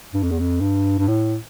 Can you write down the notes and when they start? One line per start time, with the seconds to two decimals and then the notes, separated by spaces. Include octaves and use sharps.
0.14 G2
0.23 F2
0.31 E2
0.39 F2
0.61 G2
0.99 G2
1.08 A2